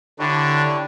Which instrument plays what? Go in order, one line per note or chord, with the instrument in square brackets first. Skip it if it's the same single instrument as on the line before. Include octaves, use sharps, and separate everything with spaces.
[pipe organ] D3 [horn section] D4 [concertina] E4 G4 C#5